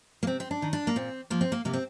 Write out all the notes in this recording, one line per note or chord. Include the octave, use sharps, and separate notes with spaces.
A#3
C3 C4
C4
D4
D#3
D4
A#3
A#2 C4
F3 A#3
C4
A#3
C3 A#3
C4